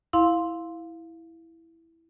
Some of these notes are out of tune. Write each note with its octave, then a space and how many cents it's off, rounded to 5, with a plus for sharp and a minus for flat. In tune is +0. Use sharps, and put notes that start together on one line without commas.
E4 -5 F5 +5 C6 +0